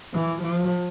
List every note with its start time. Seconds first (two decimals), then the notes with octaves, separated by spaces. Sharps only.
0.14 E3
0.43 F3